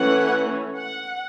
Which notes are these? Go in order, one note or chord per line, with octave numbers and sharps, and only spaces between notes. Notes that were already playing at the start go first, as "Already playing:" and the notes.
Already playing: E3 A3 C#4 F#5
F#5